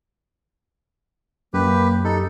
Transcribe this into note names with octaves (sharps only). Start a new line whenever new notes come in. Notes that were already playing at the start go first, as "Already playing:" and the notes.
F#2 A#3 G4 B4
D#4 G4 A4